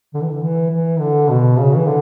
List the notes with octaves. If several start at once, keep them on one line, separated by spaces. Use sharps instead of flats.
D3
E3
D3
E3
E3
D3
B2
C#3
E3
D3